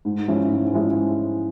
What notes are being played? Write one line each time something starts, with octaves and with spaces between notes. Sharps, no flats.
G#2
F3 G#3 C#4 E4
G#2
F3 G#3 C#4 E4